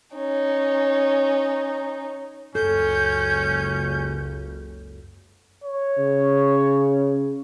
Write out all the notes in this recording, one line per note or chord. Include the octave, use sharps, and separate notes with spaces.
C#4 D#4
F#1 C#2 C#4 A4 G6
C#5
C#3